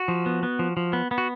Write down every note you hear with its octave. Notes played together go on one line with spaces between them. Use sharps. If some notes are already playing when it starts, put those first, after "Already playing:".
Already playing: F#4
F3
B3
B3
F3
F3
B3
B3
F#4